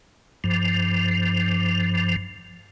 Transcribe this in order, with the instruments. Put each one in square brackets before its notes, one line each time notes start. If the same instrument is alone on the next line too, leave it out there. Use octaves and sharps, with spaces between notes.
[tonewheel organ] G2 F3